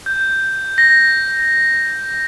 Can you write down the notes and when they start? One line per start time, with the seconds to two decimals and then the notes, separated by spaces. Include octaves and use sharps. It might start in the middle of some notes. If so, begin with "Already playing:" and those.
0.06 G6
0.78 A#6